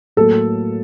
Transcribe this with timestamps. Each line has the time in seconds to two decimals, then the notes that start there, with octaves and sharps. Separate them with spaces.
0.17 A2 F#3 A#3 A4